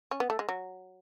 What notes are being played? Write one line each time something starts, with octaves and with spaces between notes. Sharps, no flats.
C#4
B3
A3
G#3
F#3